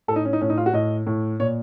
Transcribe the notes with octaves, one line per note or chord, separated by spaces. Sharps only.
A2 A4
D#4
C#4
D#4
A2 C#4
D#4
F4
F#4
A2 D#5
A2
A#2 C#5